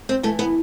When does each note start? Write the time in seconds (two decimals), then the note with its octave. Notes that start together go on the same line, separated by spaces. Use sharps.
0.09 C4
0.23 E3 A3
0.39 B3